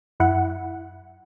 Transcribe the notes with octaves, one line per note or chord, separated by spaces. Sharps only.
F#2 E4 F#5